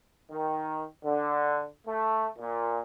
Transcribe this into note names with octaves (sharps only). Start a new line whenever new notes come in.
D#3
D3
A3
A#2